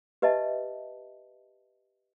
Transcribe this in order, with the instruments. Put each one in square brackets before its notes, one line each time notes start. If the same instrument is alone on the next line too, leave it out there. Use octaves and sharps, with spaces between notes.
[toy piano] G4 B4 D#5 E5 A5